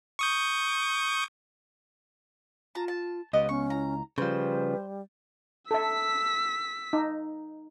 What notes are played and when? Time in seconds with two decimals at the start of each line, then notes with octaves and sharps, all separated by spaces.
0.19 C#6 D#6 G6
2.75 F4 A5 A#5
2.88 A5
3.33 C#2 B3 G4 D#5
3.49 B3 C#4 C#6
3.70 E4 A#5
4.18 C#3 F3 G3 B4 C5
5.71 A4 E5 E6 B6
6.93 D#4